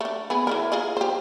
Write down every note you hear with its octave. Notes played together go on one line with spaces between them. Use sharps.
A3 D4
B3 G#4 B4
E3 E4 A#4
F4 G#4 D#5
G4 C5